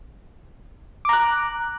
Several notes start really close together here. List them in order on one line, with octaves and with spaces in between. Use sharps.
D6 A#5 F#6